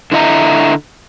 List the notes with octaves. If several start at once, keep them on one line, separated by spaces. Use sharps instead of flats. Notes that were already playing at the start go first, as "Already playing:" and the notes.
D3 E4 D#5 E5 A#5